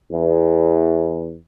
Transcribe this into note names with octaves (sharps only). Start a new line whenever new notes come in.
E2